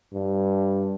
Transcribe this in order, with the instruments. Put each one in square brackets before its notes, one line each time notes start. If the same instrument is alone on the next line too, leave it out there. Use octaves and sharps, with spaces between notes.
[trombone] G2